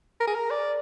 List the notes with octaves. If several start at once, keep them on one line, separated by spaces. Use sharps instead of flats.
A#4
G#4
A#4
D5